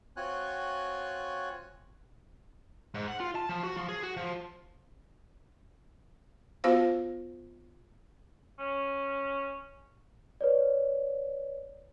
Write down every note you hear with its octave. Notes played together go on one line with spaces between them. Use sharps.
C4 F4 F#4 C#5 G#5 F#6
G#2
F#5
F4
A5
F3
F#4
F3
G#4
F#4
F3
B3 F4 F#4 C5 F5
C#4
B4 C#5 D5